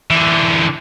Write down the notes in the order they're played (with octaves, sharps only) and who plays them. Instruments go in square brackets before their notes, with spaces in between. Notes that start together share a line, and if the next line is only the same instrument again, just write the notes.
[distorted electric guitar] D3 E3